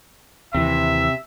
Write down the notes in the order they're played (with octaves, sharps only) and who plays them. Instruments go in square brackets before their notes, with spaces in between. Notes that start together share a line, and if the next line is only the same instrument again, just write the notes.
[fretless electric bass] D#2 E3 [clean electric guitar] C3 [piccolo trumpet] E5